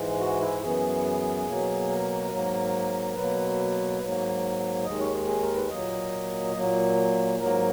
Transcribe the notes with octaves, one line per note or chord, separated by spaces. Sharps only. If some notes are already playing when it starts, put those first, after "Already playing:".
Already playing: G#2 E3 G#3
F#4
E4
F#2 E3 B3 G#4
B2 F#3 A#3
A#4
G#2 F#3 A#3
B2 F#3 A#3 B4
G#2 F#3 A#3
D#2 D#3 G#3 D#5
C#5
G#4
A#4
B4
A#2 F#3 A#3 D#5
A#2 F#3 A#3
G#2 F#3 A#3 A#4